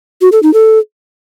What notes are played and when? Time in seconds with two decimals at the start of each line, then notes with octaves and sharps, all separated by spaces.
0.21 F#4
0.32 A4
0.43 D#4
0.54 A4